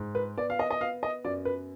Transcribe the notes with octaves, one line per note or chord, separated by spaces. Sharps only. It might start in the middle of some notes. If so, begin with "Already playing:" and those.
Already playing: G#2
B4
B3 D5
F5
D#5
D#5
B3 F5
D#5
F#2 D5
B4